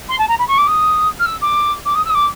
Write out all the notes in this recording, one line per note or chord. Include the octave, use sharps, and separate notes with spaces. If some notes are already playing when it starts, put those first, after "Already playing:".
C6
A5
A#5
B5
C#6
D6
D#6
F6
E6
D6
D6
D#6
E6
D#6
D6